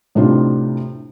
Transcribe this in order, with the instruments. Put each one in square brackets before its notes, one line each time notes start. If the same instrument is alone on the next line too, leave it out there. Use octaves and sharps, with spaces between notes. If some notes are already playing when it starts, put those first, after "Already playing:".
[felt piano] A2 C3 D4 D#4 F4